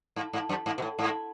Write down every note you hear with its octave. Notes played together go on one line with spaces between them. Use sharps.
G#2
G#2
F#2
G#2
B2
A2
G#2